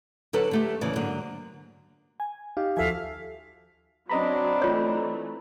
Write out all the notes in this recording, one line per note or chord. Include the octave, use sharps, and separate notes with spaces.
D3 F#3 A4 B4 A5
D3 A3 G4
D#2 C#3 E3 D5
G#2 D3 F#3 A#3
G#5
D#4 G4 F5
D#2 F3 F#4 A4 E5 F5 G#5
F#3 C4 D4 D#5 A#5 B5
E3 A3 F4 C#5